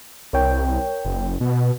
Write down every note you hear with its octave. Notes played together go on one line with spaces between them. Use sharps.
C2 A#4 C#5 G5
F#1
B2